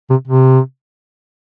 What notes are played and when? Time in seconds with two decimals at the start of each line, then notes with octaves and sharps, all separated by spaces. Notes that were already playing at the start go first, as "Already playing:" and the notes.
0.10 C3
0.27 C3